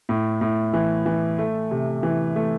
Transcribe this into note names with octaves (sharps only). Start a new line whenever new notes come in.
A2
A2
E3
E3
A3
C3
E3
A3